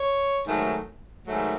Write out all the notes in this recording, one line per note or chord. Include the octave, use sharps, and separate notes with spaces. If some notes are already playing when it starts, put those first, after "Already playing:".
Already playing: C#5
G#2 D#3 F#3 A3
G#2 D#3 F#3 A3